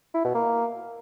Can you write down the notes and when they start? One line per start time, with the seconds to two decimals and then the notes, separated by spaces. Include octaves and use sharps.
0.14 E4
0.24 B2
0.35 A#3